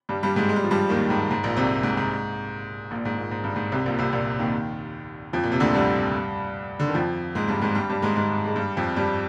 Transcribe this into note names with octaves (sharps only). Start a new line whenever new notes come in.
G2 G3
G2 G3
G#2 G#3
G#3
G3
F3
G2 G3
D#2 D#3
G#2
G#2
A#1 A#2
C2 C3
G#2
G#2
A#1 A#2
G#2
A#2
G#2
G2
G#2
C2 C3
A#1 A#2
C2 C3
A#1 A#2
D#2 D#3
F2 F3
A#2
C3
D2 D3
G2 G3
D3
D#3
F2 F3
G#2 G#3
G2 G3
G#2 G#3
G2 G3
G2 G3
G#2 G#3
G#2 G#3
G#3
G2 G3
F2 F3
G2 G3